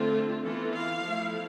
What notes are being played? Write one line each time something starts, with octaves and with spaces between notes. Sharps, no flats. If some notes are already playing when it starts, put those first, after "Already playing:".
Already playing: D3 A3 C4 F4
E3 B3 F4 A4
F5
F3 A3 E4